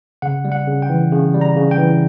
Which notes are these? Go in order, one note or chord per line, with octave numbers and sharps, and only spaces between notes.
C#3 F#5
G3
F#5
C#3
G5
E3
C#3
G3
A#5
C#3
G5
E3